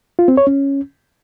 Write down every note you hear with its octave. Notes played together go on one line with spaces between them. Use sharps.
F4
C4
C#5
C#4